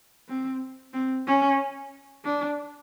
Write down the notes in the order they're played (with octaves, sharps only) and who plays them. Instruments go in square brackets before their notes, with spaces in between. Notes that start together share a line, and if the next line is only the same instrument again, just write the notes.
[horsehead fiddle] C4
C4
C#4
D4